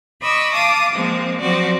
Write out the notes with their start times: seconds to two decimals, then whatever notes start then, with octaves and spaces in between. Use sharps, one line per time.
0.21 D#5 B5 C#6 D6 E6
0.52 F5 A5 D6 D#6
0.92 F3 G#3 A#3 C4
1.41 F3 F#3 C4 F#4 D5